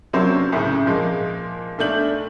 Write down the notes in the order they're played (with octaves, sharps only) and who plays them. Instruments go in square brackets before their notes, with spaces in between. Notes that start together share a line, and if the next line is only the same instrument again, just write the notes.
[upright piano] C3 F#3 A#3 C#4 D4 C5
C2 A2 C#3
A#2 F3 G#3 A#3
B1 A3 D4 G6 F#7